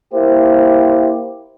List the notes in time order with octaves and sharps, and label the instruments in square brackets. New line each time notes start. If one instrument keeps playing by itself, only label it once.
[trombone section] A#3 E4 G4 C5